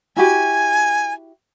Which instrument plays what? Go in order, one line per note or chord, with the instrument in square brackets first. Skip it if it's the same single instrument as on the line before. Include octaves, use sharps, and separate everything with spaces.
[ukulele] E4 F#4 G4 [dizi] G#5